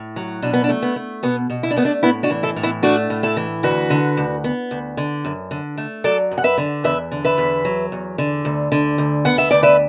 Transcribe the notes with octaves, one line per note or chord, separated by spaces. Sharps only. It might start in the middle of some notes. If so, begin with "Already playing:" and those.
Already playing: A2
F#3
B2 D4
B3
D4
A3
B3
A3
B2 B3
B2
E4
D4
A3 B3
D4
A2 B3 E4
D4 F#4
E3
E4 A4
A2
B3 E4
A3 D4 F#4
A2
E4 A4
E3
D2 F#4 B4
D3
D2
B3
D2
D3
F#2
D3
A3
F#3 A4 D5
F#2
F#5
B4 E5
D3
E2 B4 E5
D3
B4 E5
E2
F#3
E2
D3
D2
D3
D2
B3 F#5
E5
D2 D5
B4 E5